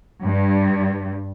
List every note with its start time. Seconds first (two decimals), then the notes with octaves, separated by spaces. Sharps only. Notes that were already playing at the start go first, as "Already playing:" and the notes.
0.23 G2